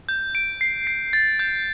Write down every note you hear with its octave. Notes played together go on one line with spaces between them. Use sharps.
G6
D7
C7
C7
A6
G6